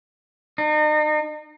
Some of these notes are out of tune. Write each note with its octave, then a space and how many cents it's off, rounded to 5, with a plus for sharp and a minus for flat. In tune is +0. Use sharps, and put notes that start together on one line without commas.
D#4 -40